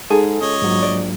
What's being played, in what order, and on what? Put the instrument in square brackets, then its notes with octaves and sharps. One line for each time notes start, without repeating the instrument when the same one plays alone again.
[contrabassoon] G#2 [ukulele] G#4 [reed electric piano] A4
[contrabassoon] C#2 [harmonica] C#5 D#5
[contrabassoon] A#1 [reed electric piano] G#2 F#3
[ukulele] D5